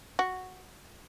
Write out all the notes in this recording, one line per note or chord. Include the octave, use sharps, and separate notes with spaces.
F#4